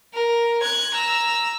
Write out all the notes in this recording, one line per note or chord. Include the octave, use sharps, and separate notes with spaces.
A#4
F#6 G#6
A#5 E6